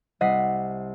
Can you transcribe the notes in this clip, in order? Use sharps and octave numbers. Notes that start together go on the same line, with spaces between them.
C2 D#5 F#5 B6 C7 D#7